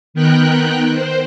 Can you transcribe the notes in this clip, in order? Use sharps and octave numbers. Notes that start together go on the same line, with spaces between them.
D#3 B3 A#4 G5 F#6
C5